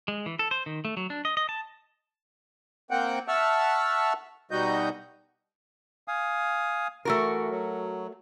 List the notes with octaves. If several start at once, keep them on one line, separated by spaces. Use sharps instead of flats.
G#3
E3
A4
C5
D#3
A3
F#3
D4
D#5
D#5
A5
A#3 C4 F#5 G5
E5 F#5 A5 C#6 E6 F6
B2 G3 D#4 F#4 D#5 G6
F5 G#5 D#6
E3 A3 F#4 A#4
F#3